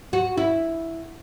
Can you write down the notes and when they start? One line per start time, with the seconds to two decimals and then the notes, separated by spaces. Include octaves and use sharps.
0.13 F#4
0.37 E4